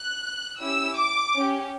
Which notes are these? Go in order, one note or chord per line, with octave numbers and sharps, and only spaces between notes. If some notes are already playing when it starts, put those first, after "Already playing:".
Already playing: F#6
C#4 E4 G4 E6
D6
C#4 G4